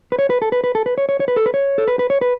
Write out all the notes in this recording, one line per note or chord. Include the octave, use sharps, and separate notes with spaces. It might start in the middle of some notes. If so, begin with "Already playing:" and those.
B4
C#5
B4
A4
B4
B4
A4
B4
C#5
C#5
C#5
B4
A4
B4
C#5
A4
B4
B4
C#5
B4